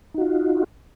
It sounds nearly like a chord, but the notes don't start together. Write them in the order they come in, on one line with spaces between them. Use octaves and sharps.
D#4 F#4 F4